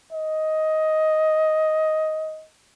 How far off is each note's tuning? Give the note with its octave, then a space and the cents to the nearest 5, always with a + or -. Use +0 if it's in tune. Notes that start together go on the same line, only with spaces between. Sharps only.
D#5 +10